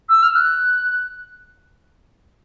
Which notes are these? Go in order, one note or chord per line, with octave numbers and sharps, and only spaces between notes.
E6
F6
F#6